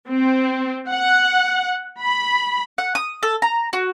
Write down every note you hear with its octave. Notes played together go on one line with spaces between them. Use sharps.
C4
F#5
B5
F#5
D#6
A4
A#5
F#4